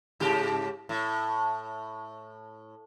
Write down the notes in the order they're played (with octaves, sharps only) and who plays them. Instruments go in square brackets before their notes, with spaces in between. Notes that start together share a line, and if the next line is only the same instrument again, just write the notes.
[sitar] G#2 C#3 G4
A2